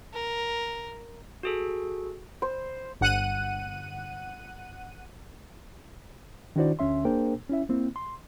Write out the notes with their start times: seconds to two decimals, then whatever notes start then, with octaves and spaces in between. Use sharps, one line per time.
0.14 A#4
1.43 F#4 G#4 A4
2.42 C5
3.01 G1 F#5 F#6 D#7
6.56 D#3 D4 E4 F#4 C5 D5
6.79 D2 D3 C#4 E5 C6
7.05 A#3 D4 G#4 A#4 C5 G5
7.49 C#4 E4 E5
7.69 A#3 C4 E4
7.96 C6